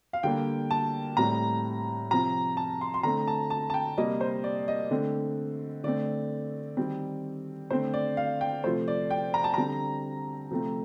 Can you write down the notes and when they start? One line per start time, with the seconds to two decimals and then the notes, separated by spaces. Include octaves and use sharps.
0.13 F5
0.23 D3 G3 A#3 G5
0.71 A5
1.17 A2 G3 C4 A#5
2.11 C3 F3 C4 A#5
2.57 A5
2.81 C6
2.94 C6
3.03 D3 A3 C4 A#5
3.27 A5
3.50 A5
3.70 A5
3.74 G5
3.98 C3 G3 A#3 D#5
4.21 C5
4.44 D5
4.68 D#5
4.91 D3 A3 C4
5.84 D3 A3 C4 D5
6.77 D#3 G3 C4
7.71 D3 A3 C4 C5
7.94 D5
8.17 F5
8.41 G5
8.64 C3 F3 A3 C5
8.88 D5
9.11 G5
9.34 A#5
9.44 A5
9.54 D3 G3 C4 A#5
10.51 C3 F3 A3 C4